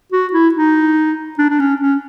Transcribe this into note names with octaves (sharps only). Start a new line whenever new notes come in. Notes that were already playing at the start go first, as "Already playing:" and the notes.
F#4
E4
D#4
D4
D4
C#4
C#4